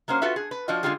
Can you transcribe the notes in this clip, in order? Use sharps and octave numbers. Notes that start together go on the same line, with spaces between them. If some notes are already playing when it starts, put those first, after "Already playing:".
F#3 A#3 C#4 C5
F4 F#4 A4 B4 E5
G#4
B4
F3 D4 F4 F#4 D#5
D3 G#3 A#3 F4 G4 G#4